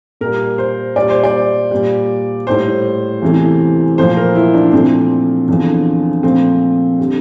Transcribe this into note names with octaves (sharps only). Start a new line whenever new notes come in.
A#2 G3 A#4
C5
A#2 G3 D5
C5
D5
A#2 G3
A2 G3 C5
E2 C3 E3 A3
A#2 F3 A3 C5
A#4
E4
D4
A#2 F3 A3 C4
E2 D3 F3
A#2 F3 A3 C4
D3 G3